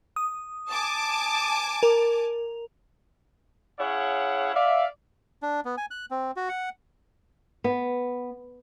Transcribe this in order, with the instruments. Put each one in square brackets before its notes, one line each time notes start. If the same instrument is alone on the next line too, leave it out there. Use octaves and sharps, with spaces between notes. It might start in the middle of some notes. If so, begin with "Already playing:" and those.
[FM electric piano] D#6
[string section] G#5 A5 D6
[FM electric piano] A#4
[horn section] C#4 E4 G#4 C#5 F5 F#5
D5 E5 F5
[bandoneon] D4
B3
G#5
F#6
C4
F#4
F#5
[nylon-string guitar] B3